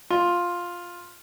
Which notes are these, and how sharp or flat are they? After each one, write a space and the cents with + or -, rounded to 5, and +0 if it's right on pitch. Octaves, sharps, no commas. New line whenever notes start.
F4 +5